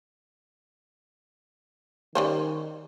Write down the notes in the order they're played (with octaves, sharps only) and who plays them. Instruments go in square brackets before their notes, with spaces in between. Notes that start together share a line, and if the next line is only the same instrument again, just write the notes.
[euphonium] D#3 [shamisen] G3 C#4 C5